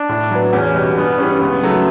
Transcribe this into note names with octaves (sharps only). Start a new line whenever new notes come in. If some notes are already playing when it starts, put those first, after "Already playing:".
Already playing: D4
A2
F#3 B3
E2 C#4
B2 G3
G2 B3
E3 G3 C#4
C#2 B3
C#3 F#3 A3